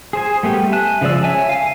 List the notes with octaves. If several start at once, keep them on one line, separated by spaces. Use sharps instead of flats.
G#4 C5 G#5
G3 A3 B3 G4
E5 G#5 A5 F#6
C#3 F3 G#3 D5 E6
C#5 E5 G#5 A5
F5 G#5